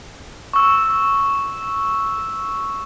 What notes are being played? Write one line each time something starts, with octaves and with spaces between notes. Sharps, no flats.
C#6 E6